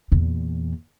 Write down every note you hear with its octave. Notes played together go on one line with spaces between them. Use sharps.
E2 A#2